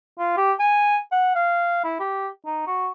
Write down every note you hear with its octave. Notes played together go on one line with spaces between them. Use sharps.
F4
G4
G#5
F#5
F5
E4
G4
D#4
F#4